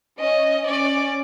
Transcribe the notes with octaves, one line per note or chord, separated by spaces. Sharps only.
C#4 D#5
C#4 D5